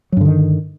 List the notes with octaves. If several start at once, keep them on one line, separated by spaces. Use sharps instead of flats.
G2 D3 D#3 F#3